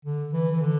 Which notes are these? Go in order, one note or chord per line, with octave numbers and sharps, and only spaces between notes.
D3
E3
E3
D3